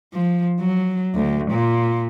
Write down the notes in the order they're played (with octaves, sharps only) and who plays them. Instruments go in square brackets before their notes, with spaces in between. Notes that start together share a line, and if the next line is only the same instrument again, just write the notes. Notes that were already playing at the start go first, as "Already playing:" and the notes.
[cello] F3
F#3
D2
A#2